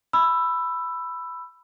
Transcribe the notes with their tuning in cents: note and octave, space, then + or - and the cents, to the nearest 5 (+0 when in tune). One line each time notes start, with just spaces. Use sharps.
B5 +5 E6 +15